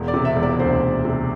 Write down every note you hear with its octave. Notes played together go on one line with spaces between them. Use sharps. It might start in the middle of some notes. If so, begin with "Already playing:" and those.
Already playing: E1
D5
C3
E5
E1
D5
D2 C5
E1
C3